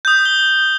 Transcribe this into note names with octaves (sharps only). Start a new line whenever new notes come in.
D#6 G6
G7